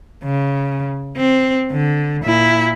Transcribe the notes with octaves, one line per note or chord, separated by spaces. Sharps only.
C#3
C4
D3
A#2 E4